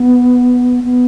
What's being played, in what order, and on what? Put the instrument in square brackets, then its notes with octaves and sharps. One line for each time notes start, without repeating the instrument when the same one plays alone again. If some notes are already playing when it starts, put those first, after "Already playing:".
Already playing: [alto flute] B3
B3